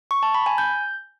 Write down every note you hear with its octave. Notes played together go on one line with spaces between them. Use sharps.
C#6
A5
B5
G#5
G6